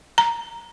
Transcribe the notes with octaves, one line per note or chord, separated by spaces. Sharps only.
A#5